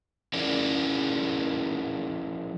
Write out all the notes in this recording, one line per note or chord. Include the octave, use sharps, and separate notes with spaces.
F3 C#4 E4 G#4 A#4 D5